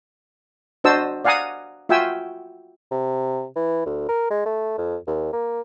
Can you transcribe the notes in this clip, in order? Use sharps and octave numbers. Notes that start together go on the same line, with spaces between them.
D4 F#4 C5 D#5 A5 E6
D5 F5 F#5 G#5 A#5 D#6
F4 F#4 E5 G5 G#5 E6
C3
E3
D2
A#4
G#3
A3
F2
D#2
A#3